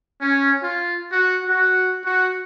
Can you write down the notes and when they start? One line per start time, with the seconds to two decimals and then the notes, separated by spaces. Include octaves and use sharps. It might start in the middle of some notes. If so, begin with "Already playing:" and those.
0.22 C#4
0.62 F4
1.12 F#4
1.47 F#4
2.06 F#4